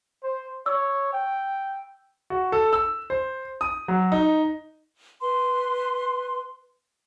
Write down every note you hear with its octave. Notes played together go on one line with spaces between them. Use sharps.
C5
C#5 E6
G5
F#4
A4
E6
C5
D#6
F#3
D#4
B4 C6